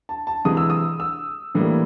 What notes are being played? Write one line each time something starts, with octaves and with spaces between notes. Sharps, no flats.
A5
A5
C3 E3 G#3 D#6
E6
D#6
E6
A2 E3 G3 A#3